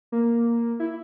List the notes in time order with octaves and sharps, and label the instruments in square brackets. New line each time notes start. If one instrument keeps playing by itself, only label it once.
[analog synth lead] A#3
E4